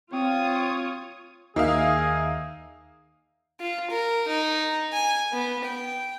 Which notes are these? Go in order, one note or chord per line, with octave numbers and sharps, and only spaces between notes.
C4 F4 C#5 D#6
D#2 A#3 D#4 G#4 E5 F5 D#6
F4
A#4
D#4
G#5
B3
G5